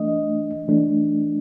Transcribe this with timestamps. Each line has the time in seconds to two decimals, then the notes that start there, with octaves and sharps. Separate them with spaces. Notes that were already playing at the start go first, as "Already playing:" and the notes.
Already playing: E3 A3 D4 D#5
0.68 E3 A3 D4